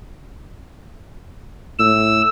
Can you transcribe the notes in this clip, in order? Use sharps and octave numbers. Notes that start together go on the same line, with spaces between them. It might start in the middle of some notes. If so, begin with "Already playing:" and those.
A2 E6